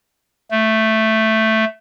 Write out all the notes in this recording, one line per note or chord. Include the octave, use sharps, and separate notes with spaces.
A3